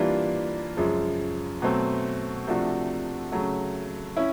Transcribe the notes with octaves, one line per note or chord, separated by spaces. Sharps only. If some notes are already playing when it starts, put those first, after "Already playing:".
Already playing: E3 G3 A#3 D4 F4
F#2 C#3 F3 G#3
B2 F#3 A3 C4
C3 F3 A3 D4 F#4
C#3 F#3 A3
C#4 E4